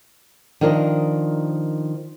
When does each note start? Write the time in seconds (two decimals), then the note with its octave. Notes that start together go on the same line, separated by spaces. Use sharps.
0.61 D#3 F3 D4 A#4 C5 D#5